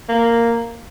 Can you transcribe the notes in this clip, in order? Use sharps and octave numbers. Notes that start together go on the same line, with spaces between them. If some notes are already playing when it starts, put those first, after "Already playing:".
A#3